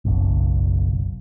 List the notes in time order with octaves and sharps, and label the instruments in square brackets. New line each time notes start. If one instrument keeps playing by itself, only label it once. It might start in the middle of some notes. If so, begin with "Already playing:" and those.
[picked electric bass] F#1 B1